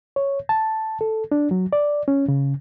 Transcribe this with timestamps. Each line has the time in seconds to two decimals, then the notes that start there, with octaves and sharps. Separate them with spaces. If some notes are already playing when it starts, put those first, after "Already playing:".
0.16 C#5
0.49 A5
1.01 A4
1.32 D4
1.51 F#3
1.73 D5
2.08 C#4
2.28 C#3